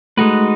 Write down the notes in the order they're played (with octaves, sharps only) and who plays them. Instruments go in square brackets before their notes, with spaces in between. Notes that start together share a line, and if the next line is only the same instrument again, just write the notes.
[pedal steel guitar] G#3 D#4 F#4 B4 [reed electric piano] A3